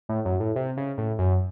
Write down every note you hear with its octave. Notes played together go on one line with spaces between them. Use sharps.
A2
F#2
A2
C3
C#3
A2
F#2